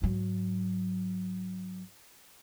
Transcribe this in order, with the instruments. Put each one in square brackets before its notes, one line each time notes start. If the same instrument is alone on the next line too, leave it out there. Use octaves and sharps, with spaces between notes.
[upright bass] G#2 F#3